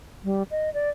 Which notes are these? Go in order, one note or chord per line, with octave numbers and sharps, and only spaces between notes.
G3
D#5
D5